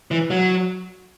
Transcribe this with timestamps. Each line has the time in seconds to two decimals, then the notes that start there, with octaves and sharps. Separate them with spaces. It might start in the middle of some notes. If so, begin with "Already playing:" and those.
0.11 E3
0.30 F#3